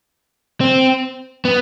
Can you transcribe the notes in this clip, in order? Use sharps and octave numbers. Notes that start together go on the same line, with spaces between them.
C4
B3